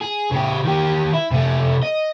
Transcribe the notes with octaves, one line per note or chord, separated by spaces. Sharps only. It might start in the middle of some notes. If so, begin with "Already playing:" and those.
G#4
C#3 G4
D#3 G4
E4
C3 A3
D#5